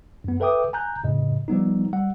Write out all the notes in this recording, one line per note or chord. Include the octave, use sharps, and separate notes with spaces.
F#2 B3
A4 B4 E5 G5 D6 D#6
G#5 A#5 F#6 G6
F2 A2 C#3 D#5
F3 G3 B3 D#4
G3 F#5